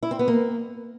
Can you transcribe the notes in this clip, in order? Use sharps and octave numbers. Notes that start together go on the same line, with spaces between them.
E4
C4
B3
A#3